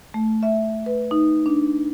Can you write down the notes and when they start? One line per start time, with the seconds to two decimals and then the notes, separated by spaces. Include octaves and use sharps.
0.14 A3
0.43 E5
0.86 B4
1.11 D#4
1.46 D4